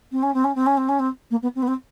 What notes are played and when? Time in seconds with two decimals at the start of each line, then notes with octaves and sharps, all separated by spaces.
0.12 C4
0.23 C#4
0.34 C4
0.44 C#4
0.55 C4
0.66 C#4
0.77 C4
0.89 C#4
0.99 C4
1.31 A#3
1.42 B3
1.55 C4
1.62 B3
1.68 C4